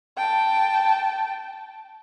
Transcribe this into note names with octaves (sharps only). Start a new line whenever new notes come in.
G5 A5